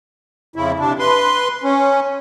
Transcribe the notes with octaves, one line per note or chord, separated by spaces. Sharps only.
F2 C#3 E4
C3 D4
B4 C6
C#4